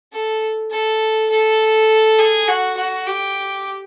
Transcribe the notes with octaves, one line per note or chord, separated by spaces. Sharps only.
A4
A4
A4
G#4
F#4
F#4
G4